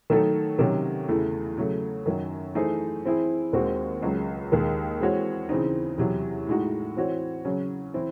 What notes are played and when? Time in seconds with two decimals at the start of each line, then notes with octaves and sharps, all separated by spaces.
0.10 D#3 F#3 A3 D#4 A4
0.59 C3 D#3 F#3 C#4
1.08 E2 C#3 E3 A3
1.57 C#3 F#3 A3
2.06 F#2 D#3 F#3
2.55 E3 A3 D#4 G#4 C5
3.05 E3 C4 E4 G#4
3.53 D#2 D#3 G#3 C4 F#4
4.02 C#2 C#3 F#3
4.52 D#2 D#3 G#3
5.00 E3 G#3 C4 F#4 C#5
5.49 C#3 E3 C4 D#4
5.98 E2 C3 F#3
6.47 A2 G#3 D#4 F#4
6.96 E3 C4 F#4 C#5
7.45 C#3 F#3 C#4
7.94 E3 C4 E4